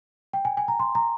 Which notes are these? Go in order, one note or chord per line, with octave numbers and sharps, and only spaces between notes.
G5
G#5
G#5
A#5
C6
A#5